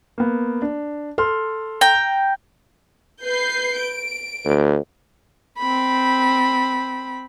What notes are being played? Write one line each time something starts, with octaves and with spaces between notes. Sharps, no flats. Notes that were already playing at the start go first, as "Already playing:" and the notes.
A#3 B3
D4
A4 C6 F6
G5 A#5
B4 G6 C7
D7
D2
C4 B5